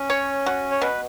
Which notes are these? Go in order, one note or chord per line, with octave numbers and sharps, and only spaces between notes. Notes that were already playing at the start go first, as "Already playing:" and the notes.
Already playing: C#4
C#5
F#4
C#5
B2 B4